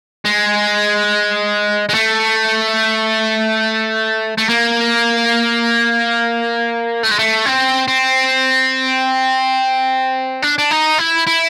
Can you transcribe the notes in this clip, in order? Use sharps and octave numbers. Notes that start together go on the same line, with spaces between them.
G#3
G#3
A3
A3
A#3
A3
G#3
A3
C4
C4
D4
D4
D#4
E4
E4